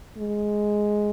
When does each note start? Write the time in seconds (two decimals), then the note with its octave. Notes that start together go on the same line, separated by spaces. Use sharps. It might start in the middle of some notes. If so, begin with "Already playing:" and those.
0.18 G#3